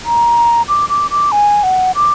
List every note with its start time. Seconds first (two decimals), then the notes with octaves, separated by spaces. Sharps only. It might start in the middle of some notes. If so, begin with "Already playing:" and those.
0.05 A#5
0.68 D6
0.89 D6
1.11 D6
1.32 G#5
1.63 F#5
1.95 D6